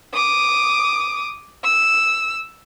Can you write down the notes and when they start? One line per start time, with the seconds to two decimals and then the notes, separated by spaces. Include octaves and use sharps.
0.14 D6 D#6
1.64 E6